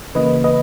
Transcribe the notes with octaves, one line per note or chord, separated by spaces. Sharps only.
C#3 E3 A#3 B4 D#5
B4 D#5